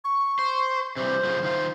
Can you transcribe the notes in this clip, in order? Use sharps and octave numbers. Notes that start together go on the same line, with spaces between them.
C#6
C5
C3 E3 G3 C5
F#2 C#3 F3
D#3 F4